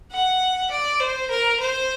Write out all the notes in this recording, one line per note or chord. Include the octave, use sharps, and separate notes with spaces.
F#5
D5
C5
A#4
C5